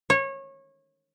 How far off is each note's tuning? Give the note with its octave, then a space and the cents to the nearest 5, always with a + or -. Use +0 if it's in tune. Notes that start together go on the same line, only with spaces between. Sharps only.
C#5 -25